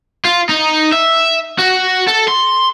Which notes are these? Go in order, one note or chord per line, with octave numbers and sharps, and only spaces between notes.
F4
D#4
E5
F#4
A4
C6